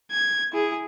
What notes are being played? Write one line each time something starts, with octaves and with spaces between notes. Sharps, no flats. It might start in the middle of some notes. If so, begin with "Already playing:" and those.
G#6
E4 G#4